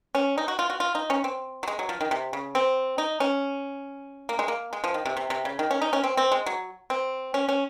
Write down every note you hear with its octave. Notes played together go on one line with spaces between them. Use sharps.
C#4
D#4
F#4
F4
F#4
F4
D#4
C#4
C4
F#3
G#3
F#3
F3
D#3
C3
C#3
C4
D#4
C#4
A#3
G#3
A#3
G#3
F3
D#3
C3
C3
C3
C#3
D#3
C#4
D#4
C#4
C4
C4
G#3
F#3
C4
C#4
C#4